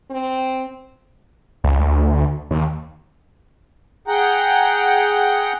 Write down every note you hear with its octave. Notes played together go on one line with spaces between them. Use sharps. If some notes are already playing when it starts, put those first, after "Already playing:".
C4
C#2
D2
D#2
G#4 F#5 G5 A#5